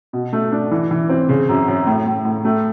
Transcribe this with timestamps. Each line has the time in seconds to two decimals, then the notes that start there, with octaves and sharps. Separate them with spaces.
0.13 B2
0.33 A3
0.52 D4
0.72 E3
0.91 E3
1.09 C4
1.29 C#3
1.49 F#2
1.68 F#2
1.87 A2
2.07 A2
2.25 A2
2.45 A3